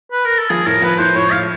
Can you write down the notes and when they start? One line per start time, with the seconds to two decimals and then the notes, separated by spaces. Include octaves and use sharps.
0.12 B4
0.24 A#4
0.37 A4
0.50 F3 G#4
0.66 A2 A#4
0.82 F3 B4
0.99 A2 C5
1.15 A2 C#5
1.32 A2 F5